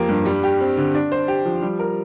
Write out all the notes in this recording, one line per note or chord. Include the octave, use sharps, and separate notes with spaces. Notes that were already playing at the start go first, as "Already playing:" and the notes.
Already playing: F2 F3 A#3 G4
G2
G3
G4
C4
D3
D4
C5
G4
F3
G3
A#4